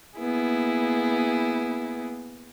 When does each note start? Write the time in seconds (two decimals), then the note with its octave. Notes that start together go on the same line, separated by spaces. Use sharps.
0.18 A#3 B3 E4 G#4